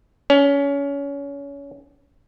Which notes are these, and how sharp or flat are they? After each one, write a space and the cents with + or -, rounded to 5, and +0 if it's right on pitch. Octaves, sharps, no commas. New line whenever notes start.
C#4 +25